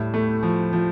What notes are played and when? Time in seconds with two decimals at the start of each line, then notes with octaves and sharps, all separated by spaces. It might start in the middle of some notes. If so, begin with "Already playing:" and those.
Already playing: A2 G3
0.14 A3
0.43 F3
0.73 F3